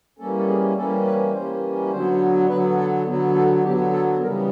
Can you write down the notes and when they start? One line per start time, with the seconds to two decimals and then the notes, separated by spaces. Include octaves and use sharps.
0.19 E3 G3 A#3 C#4 A4
0.37 A4
0.48 G#4
0.76 E3 G3 A#3 C#4 A4
1.05 B4
1.33 E3 G3 A#3 C#4 C5
1.92 D3 F#3 B3 C5
2.49 D3 F#3 B3 B4
2.78 A4
3.07 D3 F#3 B3
3.35 A4
3.64 D3 F#3 B3 G4
3.93 A4
4.21 C#3 E3 G3 B3 A#4